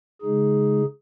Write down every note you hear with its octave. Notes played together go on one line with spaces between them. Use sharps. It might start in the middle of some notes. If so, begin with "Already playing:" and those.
C#3 G#3 D#4 G#4